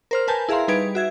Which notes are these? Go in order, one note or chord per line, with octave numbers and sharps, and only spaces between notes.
A#4 C5 F6
A#4 B4 G#5 A5 G6
E4 G#4 E5 F5 A#5 C6
G3 D#4 B4 G#6 D7
F#4 E5 G#6